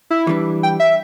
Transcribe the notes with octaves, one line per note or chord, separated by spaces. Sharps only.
E4
E3 G3 D4 B4
G5
E5